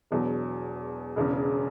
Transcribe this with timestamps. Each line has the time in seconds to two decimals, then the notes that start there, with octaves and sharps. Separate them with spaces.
0.11 E1 E2 B2 F#3
1.16 E1 E2 C#3